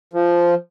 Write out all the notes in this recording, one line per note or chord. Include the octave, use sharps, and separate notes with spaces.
F3